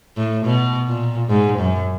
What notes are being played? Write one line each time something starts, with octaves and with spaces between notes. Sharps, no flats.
A2
B2
A#2
G#2
F#2